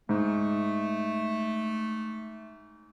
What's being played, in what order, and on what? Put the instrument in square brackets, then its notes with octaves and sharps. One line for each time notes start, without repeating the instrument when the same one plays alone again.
[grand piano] G#2 [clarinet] A3